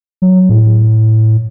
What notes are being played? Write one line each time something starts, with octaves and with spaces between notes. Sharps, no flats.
F#3
A2